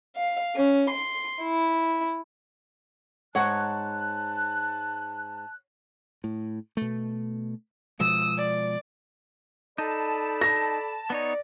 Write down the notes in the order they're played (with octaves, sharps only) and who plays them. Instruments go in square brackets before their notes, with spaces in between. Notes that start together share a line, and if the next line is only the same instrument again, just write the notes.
[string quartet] F5
C#4
C6
E4
[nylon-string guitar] G#2 D#5 [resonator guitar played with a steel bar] C#5 F#5 [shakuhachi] A5 [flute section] F#6
[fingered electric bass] A2
B2 A3
[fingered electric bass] B2 F3 G#3 [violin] D#6 E6
[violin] D5
[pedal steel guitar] D#4 [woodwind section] A4 D5 B5 [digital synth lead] A5
[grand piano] A#6
[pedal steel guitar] B3 D#4 C#5 [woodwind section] D5